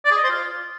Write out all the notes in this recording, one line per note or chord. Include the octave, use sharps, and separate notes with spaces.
D5
G#4
D#5
C5
F4